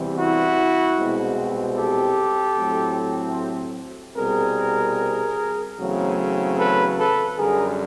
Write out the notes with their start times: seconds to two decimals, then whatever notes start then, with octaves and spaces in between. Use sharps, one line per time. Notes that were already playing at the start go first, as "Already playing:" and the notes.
Already playing: E2 C3 E3 G3 C4
0.16 E4 F#4
0.96 C2 B2 G#3 C4
1.76 G4 A4
2.57 A2 F#3 A3 C4
4.17 C2 B2 G3 C4 G#4 A#4
5.78 E2 C#3 F#3 A3 C4
6.58 A4 B4
6.98 A4 B4
7.38 F#2 D3 G3 G#4 A#4